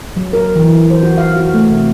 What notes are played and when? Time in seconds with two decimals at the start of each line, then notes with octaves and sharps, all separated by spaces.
0.17 F#3
0.33 A#4
0.56 E3
0.90 C5
1.03 F#4
1.18 F5
1.36 F#4
1.54 A3
1.70 C3